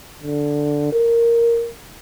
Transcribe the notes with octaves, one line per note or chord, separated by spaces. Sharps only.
D3
A#4